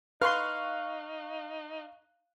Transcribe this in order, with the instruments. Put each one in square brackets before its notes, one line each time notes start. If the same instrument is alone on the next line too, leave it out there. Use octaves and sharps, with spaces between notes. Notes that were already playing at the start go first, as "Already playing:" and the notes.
[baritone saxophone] D#4 [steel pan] B4 C6 [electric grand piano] F5 C#6 F#6 [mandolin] F6